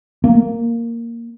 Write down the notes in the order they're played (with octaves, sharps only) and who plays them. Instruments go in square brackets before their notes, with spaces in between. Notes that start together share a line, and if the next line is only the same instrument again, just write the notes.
[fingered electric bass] A#3